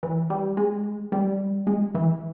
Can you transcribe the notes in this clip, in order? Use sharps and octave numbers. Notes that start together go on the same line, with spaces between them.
E3
G3
G#3
G3
G#3
E3